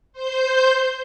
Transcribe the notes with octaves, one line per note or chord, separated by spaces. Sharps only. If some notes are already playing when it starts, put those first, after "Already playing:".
C5 G6